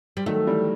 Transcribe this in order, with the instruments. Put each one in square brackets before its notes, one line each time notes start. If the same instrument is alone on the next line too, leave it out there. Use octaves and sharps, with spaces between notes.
[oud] G3
[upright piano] D#3 F#3 [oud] A3
[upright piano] E3 G3